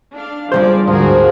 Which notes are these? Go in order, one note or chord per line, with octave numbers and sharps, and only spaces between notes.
D4 F5
G2 C3 F3 G#4 C5 D5
D2 G#2 F3 F#4 G#4 A#4